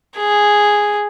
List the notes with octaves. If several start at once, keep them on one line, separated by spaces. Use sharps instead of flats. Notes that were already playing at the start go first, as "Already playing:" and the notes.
G#4